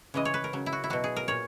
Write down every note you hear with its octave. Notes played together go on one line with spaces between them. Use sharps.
C#3 E3 G#3 D#5
C#5
B4
A#4
C#3 F#3
E4
F#4
E4
B2 F#3 F#4
G#4
A#4
A#2 C#5